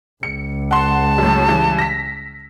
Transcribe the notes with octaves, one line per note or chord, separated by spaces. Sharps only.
C#2 C#7
F#5 A5 C6
F#2 A2
G2 E3
A#6 B6